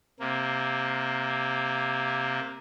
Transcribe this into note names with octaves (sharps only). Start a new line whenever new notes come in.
C3 A#3